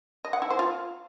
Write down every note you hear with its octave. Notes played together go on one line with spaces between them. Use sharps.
D#5
F#5
E4
C5
F4